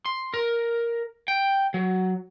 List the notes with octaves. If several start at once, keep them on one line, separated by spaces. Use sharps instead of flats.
C6
A#4
G5
F#3